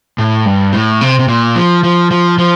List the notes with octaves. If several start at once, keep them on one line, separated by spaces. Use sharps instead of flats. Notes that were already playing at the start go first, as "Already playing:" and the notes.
A2
G2
A2
C3
C3
A#2
F3
F3
F3
F3